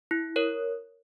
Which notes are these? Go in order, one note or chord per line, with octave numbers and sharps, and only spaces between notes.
E4
A#4 C#5